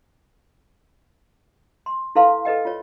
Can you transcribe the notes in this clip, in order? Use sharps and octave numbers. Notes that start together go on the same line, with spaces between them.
C6
E4 A4 B4 F5 C6
A4 B4 D#5 G5
F4 C#5